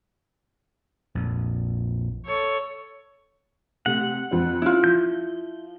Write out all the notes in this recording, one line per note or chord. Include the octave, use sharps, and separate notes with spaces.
A#1 F2
A4 C#5
C3 A3 F#5
F2 C4
C#4 E4 F4
F3 G6